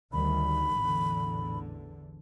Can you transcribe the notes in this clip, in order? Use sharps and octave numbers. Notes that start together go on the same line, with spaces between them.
D2 D#3 G3 B5
A1 E2 D3